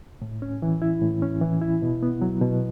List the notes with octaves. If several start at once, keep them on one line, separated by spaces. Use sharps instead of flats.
A2
C#4
E3
E4
A2
C#4
E3
E4
B2
B3
F#3
B2